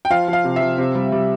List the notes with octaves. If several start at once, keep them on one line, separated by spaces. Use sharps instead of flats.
G5
F3 F5
F3 F5
C3
F3 E5
C3
G3
G3